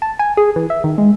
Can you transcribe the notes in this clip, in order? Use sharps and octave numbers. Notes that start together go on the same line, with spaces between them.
A5
G#5
G#4
E3
E5
D#3
G#3